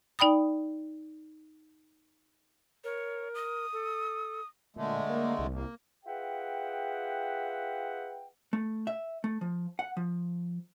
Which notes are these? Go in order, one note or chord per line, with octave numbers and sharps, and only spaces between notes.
D#4 D5 G5 B5 D#6
A#4 C#5
D#6
A4
A#2 D3 G#3 A3
A#3
C2
A#3
F4 G#4 B4 E5 F#5 G5
A3
E5
A3
F3
F#5
F3